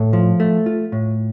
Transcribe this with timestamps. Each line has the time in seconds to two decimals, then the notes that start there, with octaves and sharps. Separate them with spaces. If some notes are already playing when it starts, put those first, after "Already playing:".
Already playing: A2 A4
0.13 F3
0.40 A3
0.66 F4
0.92 A2